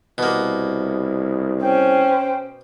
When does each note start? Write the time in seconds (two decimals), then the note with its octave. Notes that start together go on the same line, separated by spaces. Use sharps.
0.18 C2 B2 A#3
1.62 C#4 C5 G5